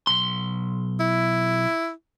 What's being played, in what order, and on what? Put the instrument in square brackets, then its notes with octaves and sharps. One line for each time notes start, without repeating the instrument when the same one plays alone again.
[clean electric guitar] B1 C6
[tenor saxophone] E4